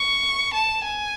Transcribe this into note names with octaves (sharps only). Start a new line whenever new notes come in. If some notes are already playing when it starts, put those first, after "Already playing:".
Already playing: C#6
A5
G#5